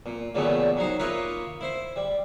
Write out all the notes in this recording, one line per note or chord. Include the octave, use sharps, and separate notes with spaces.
A#2
A#2 C#3 E3 G3 A3 B3
F#3 D#4 C5
A#3 F4 B4 C#5 D#5 E5
E4 C5
G3